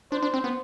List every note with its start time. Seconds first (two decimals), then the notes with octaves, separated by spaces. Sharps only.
0.12 D4 C5
0.23 D4
0.34 C4
0.44 B3